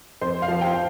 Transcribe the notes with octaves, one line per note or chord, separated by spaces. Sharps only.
F2 C5
F5
F3
G5